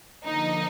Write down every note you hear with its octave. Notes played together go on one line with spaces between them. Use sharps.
D3 F3 A#3 D#4